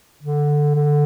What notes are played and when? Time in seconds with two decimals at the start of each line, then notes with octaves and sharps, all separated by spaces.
0.23 D3
0.75 D3